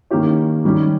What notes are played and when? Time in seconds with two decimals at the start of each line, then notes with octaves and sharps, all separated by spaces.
0.11 D#3 A#3 C#4 G4 C#5
0.64 D#3 G3 C#4 G4